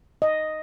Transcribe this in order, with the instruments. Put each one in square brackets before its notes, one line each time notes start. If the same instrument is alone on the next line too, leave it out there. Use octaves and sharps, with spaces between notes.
[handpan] D#5